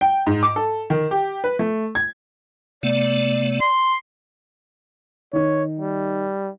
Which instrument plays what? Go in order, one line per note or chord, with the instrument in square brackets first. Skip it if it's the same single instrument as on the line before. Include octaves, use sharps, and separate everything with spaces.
[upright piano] G5
G#2
D6
A4
D#3
G4
B4
A3
G#6
[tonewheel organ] C3 A3 B3 [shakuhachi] D5
[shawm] C6
[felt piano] D#3 D#4 [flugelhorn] C#5
[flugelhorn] G3